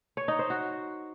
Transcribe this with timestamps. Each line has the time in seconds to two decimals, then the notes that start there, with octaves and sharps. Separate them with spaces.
0.17 C#5
0.28 D#4
0.39 C5
0.50 F#4